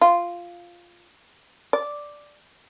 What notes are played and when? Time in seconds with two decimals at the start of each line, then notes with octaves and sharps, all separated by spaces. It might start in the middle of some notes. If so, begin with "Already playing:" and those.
0.01 F4
1.73 D5